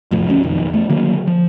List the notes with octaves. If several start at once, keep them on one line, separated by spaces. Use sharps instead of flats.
F1 E2 A2 F3
D2 F3 B3 C#4
F#1 B1 F2 D#3
E2 A3
D3 D#3 F#3 A#3
F3